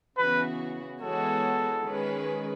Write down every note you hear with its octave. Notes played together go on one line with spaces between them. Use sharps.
C#3 E3 B3 F#4 B4
E3 G#3 B3 F#4 A4 C#5
D#3 G#3 C#4 G#4 B4